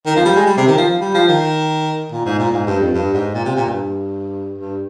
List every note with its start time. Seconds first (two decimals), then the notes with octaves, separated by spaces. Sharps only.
0.06 D#3
0.16 F3
0.25 G3
0.36 G#3
0.46 G3
0.57 C3
0.67 D#3
0.78 F3
1.01 G3
1.15 F3
1.28 D#3
2.12 A#2
2.26 G#2
2.38 A#2
2.52 G#2
2.67 G2
2.81 F2
2.94 G2
3.14 G#2
3.34 A#2
3.45 C3
3.56 A#2
3.66 G2
4.58 G2